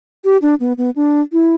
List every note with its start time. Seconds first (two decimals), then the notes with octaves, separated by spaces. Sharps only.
0.25 G4
0.42 D4
0.60 B3
0.78 B3
0.96 D4
1.33 E4